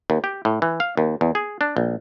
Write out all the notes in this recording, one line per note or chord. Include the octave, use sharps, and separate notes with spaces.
D#2
G4
A2
E3
F5
D#2
E2
G#4
D4
A#1